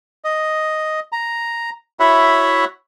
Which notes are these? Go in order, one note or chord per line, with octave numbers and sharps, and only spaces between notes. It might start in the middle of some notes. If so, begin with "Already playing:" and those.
D#5
A#5
E4 F#4 C#5 E5 F#5 B5